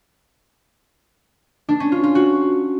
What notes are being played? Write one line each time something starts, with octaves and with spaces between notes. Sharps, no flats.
D4
C#4
F4
F4
F#4